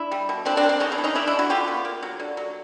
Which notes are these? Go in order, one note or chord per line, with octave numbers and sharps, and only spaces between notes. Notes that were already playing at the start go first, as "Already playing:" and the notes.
Already playing: D4 E4
G3
B2
F3 C4 D4
C4 D4
A#3
C4 D4
C#3 C#4 D#4
D4 E4
E3
C#4 D#4
C#3 D4 E4
D4 E4
C#3
E4 F#4
D3 F4 G4
B3
A#3
F#3
D3
F#3